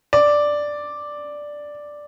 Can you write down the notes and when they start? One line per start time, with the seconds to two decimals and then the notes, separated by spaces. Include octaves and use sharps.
0.13 D5